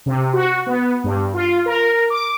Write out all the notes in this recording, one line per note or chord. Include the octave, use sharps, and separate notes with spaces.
C3
F#4
B3
G2
F4
A#4
D6